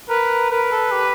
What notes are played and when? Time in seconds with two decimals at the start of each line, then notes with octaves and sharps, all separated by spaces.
0.09 A#4 B4
0.51 A#4 B4
0.71 A4
0.92 G4